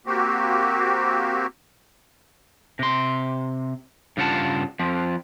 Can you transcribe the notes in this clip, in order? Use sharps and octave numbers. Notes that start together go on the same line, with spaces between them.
A#3 C4 F#4 G4
C3 C6
G2 C#3 F4 F#5 A5
F3 C4